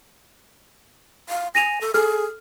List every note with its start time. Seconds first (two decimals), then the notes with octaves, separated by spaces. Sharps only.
1.29 F5
1.55 G#5 A#6 D#7 F7
1.81 A4
1.94 G#4 A4 F6